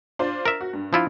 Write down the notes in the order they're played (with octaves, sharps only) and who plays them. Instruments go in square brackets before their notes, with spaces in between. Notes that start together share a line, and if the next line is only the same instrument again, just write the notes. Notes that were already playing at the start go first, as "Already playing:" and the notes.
[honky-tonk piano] D4 F4 C5
[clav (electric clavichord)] A#4 E5
[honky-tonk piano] F#4
G2
[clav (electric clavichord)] F3 E4 F4